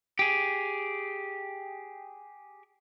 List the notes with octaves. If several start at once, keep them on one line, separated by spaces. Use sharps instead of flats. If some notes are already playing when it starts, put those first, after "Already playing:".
G4 G#4